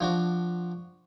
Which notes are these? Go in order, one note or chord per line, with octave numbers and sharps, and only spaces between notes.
F3 D4 F#4